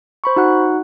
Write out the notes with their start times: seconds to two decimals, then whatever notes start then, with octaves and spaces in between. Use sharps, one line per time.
0.24 C5 B5 C#6
0.36 D#4 F#4 F#5 F#6